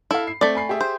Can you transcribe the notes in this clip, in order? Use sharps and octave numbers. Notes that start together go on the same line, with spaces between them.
E4 A4 F5
C7
A3 C4 D5
G#5 B5 C7
G4 G#4 E5
C5